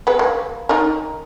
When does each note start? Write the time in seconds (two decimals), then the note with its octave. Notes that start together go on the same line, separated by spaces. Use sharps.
0.07 G#3 B3 B4
0.19 A#3
0.69 D#3 D#4 A#4